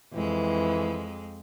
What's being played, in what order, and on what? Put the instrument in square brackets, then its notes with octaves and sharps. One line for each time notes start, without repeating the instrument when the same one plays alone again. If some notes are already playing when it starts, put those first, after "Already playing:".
[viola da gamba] F2 G#3 [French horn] E3